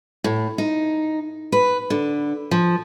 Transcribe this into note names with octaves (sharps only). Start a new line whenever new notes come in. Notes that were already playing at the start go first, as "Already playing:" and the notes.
A2
D#4
B4
D3
F3